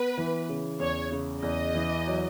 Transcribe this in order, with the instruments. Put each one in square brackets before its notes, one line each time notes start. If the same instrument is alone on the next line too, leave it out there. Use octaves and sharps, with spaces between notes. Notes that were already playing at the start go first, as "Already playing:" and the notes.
Already playing: [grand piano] B3 [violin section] B4
[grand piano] E3
C#3
[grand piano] E2 [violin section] C#5
[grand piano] C#3
[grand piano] E2 [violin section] D#5
[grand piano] E3
F#3